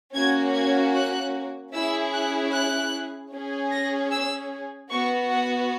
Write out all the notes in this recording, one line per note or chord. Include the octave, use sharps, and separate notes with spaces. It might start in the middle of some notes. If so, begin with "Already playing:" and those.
A#3 C#4 F#4 G#6
G#6
F#6
C#4 E4 G#4 E6
F#6
F#6
C#4 G#4
A#6
E6
B3 F#4 C#6
F#5